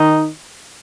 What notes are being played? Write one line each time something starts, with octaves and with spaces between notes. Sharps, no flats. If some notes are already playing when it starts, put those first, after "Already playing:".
Already playing: D#3 D#4